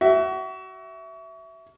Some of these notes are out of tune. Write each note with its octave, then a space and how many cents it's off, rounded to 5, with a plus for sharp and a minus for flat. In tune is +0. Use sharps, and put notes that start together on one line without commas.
F#4 +30 E5 +0